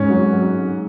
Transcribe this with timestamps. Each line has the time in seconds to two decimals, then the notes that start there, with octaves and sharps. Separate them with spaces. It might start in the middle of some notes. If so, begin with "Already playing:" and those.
Already playing: G#2 C#4
0.09 F#3
0.33 F#3